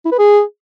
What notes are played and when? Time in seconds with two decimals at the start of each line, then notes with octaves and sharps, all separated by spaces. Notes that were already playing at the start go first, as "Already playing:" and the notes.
0.05 E4
0.12 B4
0.19 G#4